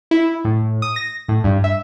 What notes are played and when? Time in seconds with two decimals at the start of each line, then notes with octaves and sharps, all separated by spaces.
0.11 E4
0.45 A2
0.82 D#6
0.96 A#6
1.28 A2
1.44 G2
1.64 E5